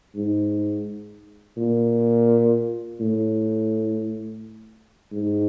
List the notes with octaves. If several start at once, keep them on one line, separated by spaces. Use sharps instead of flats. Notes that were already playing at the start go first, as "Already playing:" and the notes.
G#2
A#2
A2
G#2